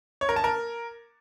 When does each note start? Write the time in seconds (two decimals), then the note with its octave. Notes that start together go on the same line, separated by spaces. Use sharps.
0.21 C#5
0.29 A#4
0.36 A5
0.44 A#4